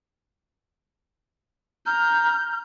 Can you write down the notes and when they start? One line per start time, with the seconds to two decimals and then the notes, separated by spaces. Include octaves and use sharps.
1.86 A#5 F6 G6